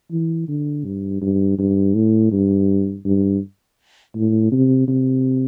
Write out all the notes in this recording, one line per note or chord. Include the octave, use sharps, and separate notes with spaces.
E3
D3
G2
G2
G2
A2
G2
G2
A2
C3
C3